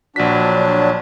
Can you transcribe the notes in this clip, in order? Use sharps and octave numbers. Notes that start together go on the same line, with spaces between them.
A#1 F#3 D4 B6